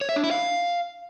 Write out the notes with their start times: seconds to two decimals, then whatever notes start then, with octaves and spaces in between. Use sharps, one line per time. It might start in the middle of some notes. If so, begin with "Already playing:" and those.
0.01 C#5
0.09 E5
0.16 D4
0.24 E4
0.31 F5